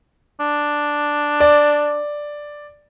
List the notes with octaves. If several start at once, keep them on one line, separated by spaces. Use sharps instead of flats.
D4
D5